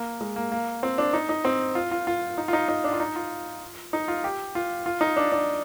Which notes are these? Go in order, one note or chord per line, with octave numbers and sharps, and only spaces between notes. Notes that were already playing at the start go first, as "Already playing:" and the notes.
Already playing: A#3
G#3
A#3
A#3
C4
D4
D#4
D#4
C4
F4
F4
F4
D#4
F4
D#4
D#4
D4
F4
D#4
F4
D#4
F4
G4
F4
F4
D#4
D4
D4